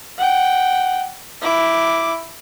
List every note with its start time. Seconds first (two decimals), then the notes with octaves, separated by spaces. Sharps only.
0.17 F#5 G5
1.41 E4 D6